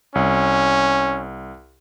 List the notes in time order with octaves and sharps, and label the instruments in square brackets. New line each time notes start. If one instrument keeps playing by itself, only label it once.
[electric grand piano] C2 [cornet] C#4